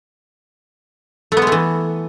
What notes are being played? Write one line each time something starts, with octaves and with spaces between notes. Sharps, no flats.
A3
B3
G#3
A3
E3